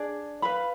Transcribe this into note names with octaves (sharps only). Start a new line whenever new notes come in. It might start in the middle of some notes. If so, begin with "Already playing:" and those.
Already playing: D4 G#4 D5
B4 F5 B5